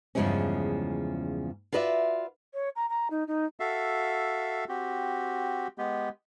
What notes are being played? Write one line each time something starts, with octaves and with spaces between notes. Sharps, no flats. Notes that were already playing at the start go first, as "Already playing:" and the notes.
E2 G2 C#3 F3 G#3 C#4
F4 F#4 B4 D5 E5
C#5
A#5
A#5
D#4
D#4
F#4 A4 E5 F5
C4 F#4 G4
G#3 B3 G4